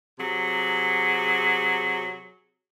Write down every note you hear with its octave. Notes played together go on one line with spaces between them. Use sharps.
C3 F#3 G#4